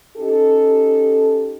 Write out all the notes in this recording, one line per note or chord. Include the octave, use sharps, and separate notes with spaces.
C#4 D#4 G4 A4